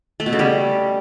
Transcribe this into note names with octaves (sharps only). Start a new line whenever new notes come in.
A3
B2
C#3
G3